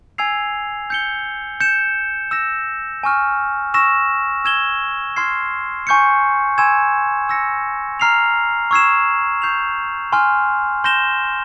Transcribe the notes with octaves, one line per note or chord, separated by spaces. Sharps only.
G#5 E6 G#6 C7 F7
G6 C#7 G7
G6 C#7 E7
E6 A#6 E7
G#5 C#6 F6
C#6 E6 A#6 E7
E6 G#6 E7 G7
C6 F6 G#6 C7
G#5 C#6 G6 C#7
G#5 C6 E6 G#6 E7
E6 A#6 C#7
A#5 F6 C7 F7
C#6 E6 G#6 C7 E7
C#6 G6 C7 F7
G#5 C6 F6
C6 G6 A#6 E7 G7